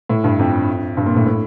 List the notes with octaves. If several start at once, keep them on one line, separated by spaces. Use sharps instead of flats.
A2
G2
F2
G2
A#2
A2
A2